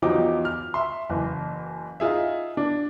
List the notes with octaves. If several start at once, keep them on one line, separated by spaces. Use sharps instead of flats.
E2 F3 F#3 D#4 G4 D6
F6
E5 C6
F#1 E3
D#4 F4 G#4 E5
D4